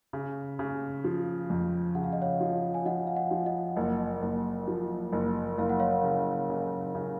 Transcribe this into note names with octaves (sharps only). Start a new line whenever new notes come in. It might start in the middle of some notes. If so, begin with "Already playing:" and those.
C#3
C#3
F3
F2
C#3 F#5
F5
D#5
C#5 F5
F3
G#5
F3 D#5 F#5
F5
D#5 F#5
F3
D#5 F#5
F#1
F#1
F3
F#1
F#1 F5
F#5
C#5 F5
C#3
C#3
C#3